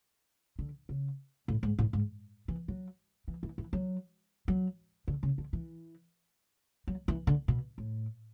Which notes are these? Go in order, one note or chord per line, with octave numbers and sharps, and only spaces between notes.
D3
C#3
A2
G#2
A2
G#2
E3
F#3
E3
E3
E3
F#3
F#3
D3
C#3
D3
E3
F#3
E3
D3
B2
A2